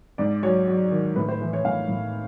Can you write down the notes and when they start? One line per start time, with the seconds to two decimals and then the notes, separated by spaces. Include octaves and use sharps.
0.18 G#2 D5
0.43 F#3 C#5
0.67 F#3
0.91 D#3
1.15 A2 B4
1.29 C5
1.40 E3 B4
1.53 C#5
1.64 A2 F5
1.89 A2